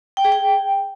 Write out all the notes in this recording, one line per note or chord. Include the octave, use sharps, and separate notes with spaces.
G5
G#4
G5